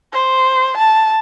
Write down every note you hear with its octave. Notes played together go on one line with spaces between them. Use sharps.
C5
A5